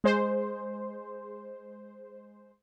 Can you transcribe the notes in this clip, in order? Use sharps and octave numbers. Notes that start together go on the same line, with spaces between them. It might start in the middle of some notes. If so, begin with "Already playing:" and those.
G#3 C5